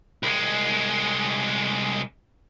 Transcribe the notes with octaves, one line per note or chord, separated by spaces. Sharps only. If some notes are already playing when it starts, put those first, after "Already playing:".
C2 G#3